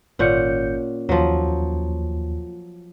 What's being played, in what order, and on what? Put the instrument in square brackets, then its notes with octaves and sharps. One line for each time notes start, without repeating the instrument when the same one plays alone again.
[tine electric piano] G#1 G6 C#7 [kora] A#2 C#4 F#5
[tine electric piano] D#2 [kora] F3 F#3